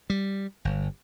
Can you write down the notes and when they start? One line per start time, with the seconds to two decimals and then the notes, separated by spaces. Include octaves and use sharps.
0.10 G3
0.65 G1